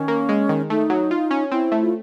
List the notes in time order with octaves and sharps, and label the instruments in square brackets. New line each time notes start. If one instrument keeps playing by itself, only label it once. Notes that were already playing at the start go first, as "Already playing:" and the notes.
Already playing: [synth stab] D#3 [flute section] C#4
[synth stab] A#3
G#3
D#3
[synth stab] A3 [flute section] D#4
[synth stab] F#3
F4
C#4
[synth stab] C4 [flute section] E4
[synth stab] A3
[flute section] F4